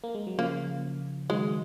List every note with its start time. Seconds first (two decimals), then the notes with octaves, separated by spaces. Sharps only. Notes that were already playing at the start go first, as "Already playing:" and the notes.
0.04 A#3
0.14 G#3
0.27 F#3
0.38 C#3 F3 A#3
1.30 D#3 F#3 G#3